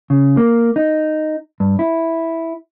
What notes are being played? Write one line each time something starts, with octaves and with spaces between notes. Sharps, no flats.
C#3
A#3
D#4
G2
E4